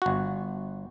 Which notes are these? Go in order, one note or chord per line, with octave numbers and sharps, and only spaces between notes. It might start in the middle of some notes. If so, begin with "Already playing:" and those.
G1 F#4